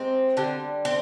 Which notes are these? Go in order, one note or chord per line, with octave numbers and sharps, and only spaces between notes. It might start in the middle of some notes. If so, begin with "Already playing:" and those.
Already playing: C3 G#3 C4
D3 G3
C4